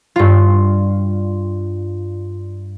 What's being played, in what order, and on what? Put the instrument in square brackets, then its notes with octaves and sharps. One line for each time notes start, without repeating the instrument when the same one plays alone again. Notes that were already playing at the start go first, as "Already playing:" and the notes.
[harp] G2 F4